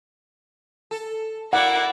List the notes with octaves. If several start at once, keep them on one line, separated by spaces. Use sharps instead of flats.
A4
A#3 E4 D5 F#5